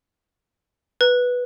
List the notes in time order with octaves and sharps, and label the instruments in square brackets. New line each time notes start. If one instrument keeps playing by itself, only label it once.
[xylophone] B4